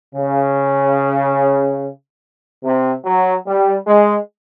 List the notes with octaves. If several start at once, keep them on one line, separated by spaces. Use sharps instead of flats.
C#3
C3
F#3
G3
G#3